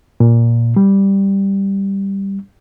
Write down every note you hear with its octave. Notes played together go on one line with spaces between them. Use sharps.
A#2
G3